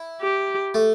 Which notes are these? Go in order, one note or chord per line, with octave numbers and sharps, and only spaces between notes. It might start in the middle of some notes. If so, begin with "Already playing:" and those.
Already playing: E4
G4
A3